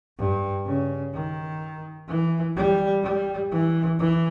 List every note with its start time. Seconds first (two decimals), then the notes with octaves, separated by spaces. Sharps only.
0.18 G2
0.66 C#3
1.14 D#3
2.08 E3
2.56 G3
3.03 G3
3.51 E3
3.99 E3